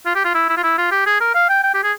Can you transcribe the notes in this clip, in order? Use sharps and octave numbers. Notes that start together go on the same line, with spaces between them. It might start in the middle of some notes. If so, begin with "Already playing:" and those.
F4
G4
F4
E4
E4
F4
E4
F4
G4
G#4
A#4
F5
G5
G5
G4
G#4